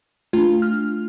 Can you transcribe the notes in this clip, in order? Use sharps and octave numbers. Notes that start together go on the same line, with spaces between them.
A3 D4 F4
F6